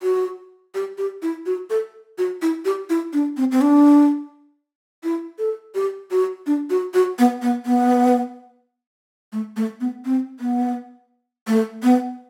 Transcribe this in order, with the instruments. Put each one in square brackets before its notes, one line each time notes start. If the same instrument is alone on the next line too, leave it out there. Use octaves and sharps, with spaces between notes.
[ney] F#4
G4
G4
E4
F#4
A4
F#4
E4
G4
E4
D4
C4
C4
D4
E4
A4
G4
F#4
D4
F#4
F#4
B3
B3
B3
A3
A3
B3
C4
B3
A3
B3